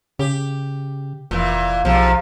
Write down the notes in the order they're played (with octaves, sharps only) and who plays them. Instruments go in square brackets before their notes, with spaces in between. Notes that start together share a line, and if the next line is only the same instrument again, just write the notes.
[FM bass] C#3 [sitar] G4
[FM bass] F1 [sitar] A#2 E3
[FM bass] B1 [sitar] G#2 C3 F3